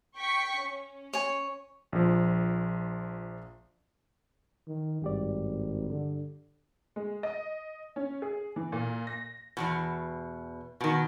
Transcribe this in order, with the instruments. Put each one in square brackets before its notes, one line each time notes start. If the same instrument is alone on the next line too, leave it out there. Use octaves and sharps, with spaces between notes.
[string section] G5 C#6 B6
C#4
[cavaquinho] C#5 G#5
[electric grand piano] A#1 F3
[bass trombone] D#3
[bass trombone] G#1 [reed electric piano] G2 G4 D5
[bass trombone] D3
[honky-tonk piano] G#3
D#5
C#4
G#4
E3
A#2
A#6
[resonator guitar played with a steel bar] E2 G2 B2
B2 D#3